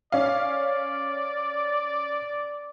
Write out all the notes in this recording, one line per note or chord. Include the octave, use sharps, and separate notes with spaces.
C#4 D5 F5